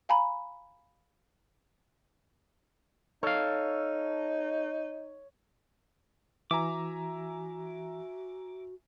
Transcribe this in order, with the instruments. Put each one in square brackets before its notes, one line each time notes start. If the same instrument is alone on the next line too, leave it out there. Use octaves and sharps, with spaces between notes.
[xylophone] F5 G#5 A#5 B5
[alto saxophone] D#4 [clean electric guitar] A4 F5 [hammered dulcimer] C#5
[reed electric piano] E3 [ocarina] F#4 [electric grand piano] E5 G#5 A#5 [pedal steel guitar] D6